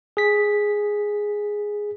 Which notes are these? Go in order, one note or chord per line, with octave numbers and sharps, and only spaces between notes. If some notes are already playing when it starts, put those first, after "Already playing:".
G#4 B6